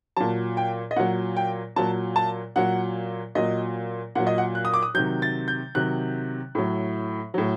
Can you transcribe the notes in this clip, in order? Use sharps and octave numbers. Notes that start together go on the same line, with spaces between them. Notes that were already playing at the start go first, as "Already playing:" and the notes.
A#2 F#3 A5
G5
D#5
A#2 F#3 F#5
G5
A#2 F#3 A5
A5
A#2 F#3 F#5
A#2 F#3 D#5
A#2 F#3 F#5
D#5
F#5
F#6
D#6
D6
D#6
C3 D#3 F#3 G6
A6
G6
C3 D#3 F#3 F#6
A2 F#3
A2 F#3